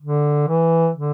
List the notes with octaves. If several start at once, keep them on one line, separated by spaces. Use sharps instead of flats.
D3
E3
D3